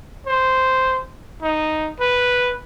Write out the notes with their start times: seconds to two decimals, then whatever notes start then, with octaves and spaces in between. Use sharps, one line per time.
0.27 C5
1.42 D#4
2.00 B4